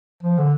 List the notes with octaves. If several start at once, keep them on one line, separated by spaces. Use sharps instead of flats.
F3
D3